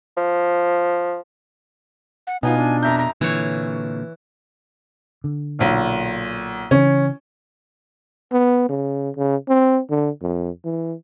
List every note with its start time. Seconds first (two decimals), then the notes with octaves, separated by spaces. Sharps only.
0.17 F3
2.27 F#5
2.43 B2 B3 D#4 F4 G#5
2.57 D4
2.83 F2 E5 A#5 G6
2.98 A#5
3.21 A#2 D3 E3 C#5
5.24 D3
5.59 B1 A#2
6.71 C#3 E3 C#4
8.32 B3
8.69 C#3
9.16 C#3
9.49 C4
9.90 D3
10.22 F2
10.65 E3